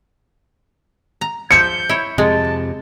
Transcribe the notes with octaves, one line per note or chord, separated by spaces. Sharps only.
A#5
F3 E5 G6 C#7
E4 C#5
F2 C3 G#3 A5